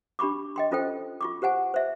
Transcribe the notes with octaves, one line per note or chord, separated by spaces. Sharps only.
D4 G4 B5 C#6 D6
D#5 G5 C6
C#4 F4 A4 C5 G5
F4 C#6 D6
G4 C5 F#5 G#5
C5 E5